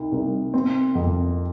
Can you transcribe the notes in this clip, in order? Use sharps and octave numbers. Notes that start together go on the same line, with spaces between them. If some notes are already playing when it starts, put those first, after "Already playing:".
Already playing: C2 D#4
C2
C4
F2